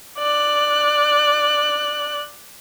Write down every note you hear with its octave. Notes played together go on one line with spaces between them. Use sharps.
D5 F#6